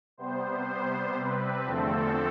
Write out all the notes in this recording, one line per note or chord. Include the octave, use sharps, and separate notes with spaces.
C3 G3 B3 C5
C3 G3 B3 C5
C3 G3 C4 B4
E2 D3 F3 A3 C4 A4